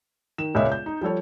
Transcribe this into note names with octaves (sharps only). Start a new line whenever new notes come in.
D#3 E7
E1 C#2 A#2 C#4 D#5 E5
G6
D#4
F3 G3 A4 C#5